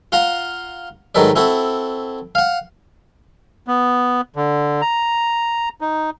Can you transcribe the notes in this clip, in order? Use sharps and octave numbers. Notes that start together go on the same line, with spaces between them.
F4 F5 F#5 A#5
G#2 D#3 F#3 A4 B4 D5
C4 E4 F#4 A4
F5 F#5
B3
D3
A#5
D#4